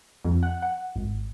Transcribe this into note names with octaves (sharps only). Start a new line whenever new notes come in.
F2
F#5
F#5
G#1